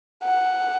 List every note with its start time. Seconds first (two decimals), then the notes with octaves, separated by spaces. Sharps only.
0.24 F#5